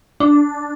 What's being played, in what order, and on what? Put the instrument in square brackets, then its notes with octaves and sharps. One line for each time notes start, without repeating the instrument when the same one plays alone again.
[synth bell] D4